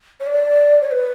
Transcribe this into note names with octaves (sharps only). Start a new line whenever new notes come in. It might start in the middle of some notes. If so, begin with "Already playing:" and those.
C#5
D5
C#5
B4